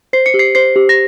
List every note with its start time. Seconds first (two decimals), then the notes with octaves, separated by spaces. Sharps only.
0.13 C5 C7
0.26 C#7
0.34 G4
0.39 C7
0.55 C5 C7
0.76 G4
0.89 A#6